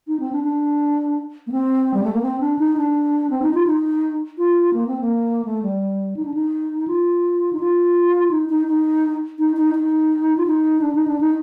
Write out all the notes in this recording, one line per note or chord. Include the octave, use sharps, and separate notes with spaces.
D#4
C4
D4
D4
A#3
C4
G3
A3
A#3
C4
D4
D#4
D4
C4
D#4
F4
D#4
F4
A#3
C4
A#3
A3
G3
D#4
D4
D#4
F4
D#4
F4
D#4
D#4
D#4
D#4
D#4
D#4
F4
D#4
D4
D#4
D4
D#4